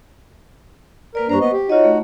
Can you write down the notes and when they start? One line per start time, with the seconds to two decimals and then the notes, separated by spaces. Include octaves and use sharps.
1.15 A#3 A#4 B4 D5
1.29 G2 D4 C5 A#5 C#6
1.41 B3 D#5
1.52 G4
1.69 D#4 F4 F#4 C#5 D#5
1.84 A3